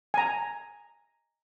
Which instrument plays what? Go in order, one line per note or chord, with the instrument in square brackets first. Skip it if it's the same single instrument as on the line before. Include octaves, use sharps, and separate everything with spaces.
[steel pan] G#5 A#5